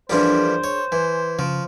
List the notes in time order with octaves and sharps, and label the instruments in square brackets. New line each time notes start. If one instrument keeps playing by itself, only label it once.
[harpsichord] E3 F3 G3 [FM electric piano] D4 G#4 A#4 [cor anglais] C5
[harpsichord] C#5
[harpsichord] E3 [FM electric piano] G#5
[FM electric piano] C#3 [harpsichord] F3